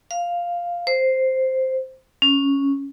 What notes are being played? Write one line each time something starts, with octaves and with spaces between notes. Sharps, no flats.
F5
C5
C#4